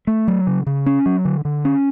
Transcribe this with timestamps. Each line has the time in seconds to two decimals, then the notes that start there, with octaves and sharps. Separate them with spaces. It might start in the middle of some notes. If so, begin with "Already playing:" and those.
0.07 A3
0.28 F#3
0.47 C#3
0.67 C#3
0.86 C#4
1.06 F#3
1.25 D3
1.45 D3
1.65 C#4